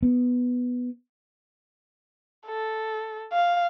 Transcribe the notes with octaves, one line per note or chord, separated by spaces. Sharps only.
B3
A4
F5